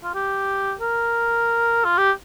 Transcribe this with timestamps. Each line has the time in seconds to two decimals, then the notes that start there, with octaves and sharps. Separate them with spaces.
0.04 F4
0.14 G4
0.80 A#4
1.85 F4
1.98 G4